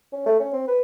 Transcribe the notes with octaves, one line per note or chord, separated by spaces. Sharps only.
C#4
A3
C#4
C4
B4